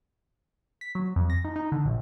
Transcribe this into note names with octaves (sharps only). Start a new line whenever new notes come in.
B6
F#3
F2
A#6
D#4
D#4
D3
A#1